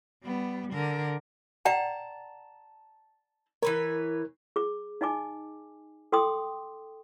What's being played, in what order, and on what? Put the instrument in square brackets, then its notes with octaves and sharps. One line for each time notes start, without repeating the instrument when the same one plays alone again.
[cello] G3 B3
D3 A#4
[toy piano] D5 F#5 G5 [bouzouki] A5 A#5
[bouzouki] E3 B4 C#5 [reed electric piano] A#4
[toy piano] G#4 D6
D#4 D#5 G#5 D6
A4 G5 C6 D6 D#6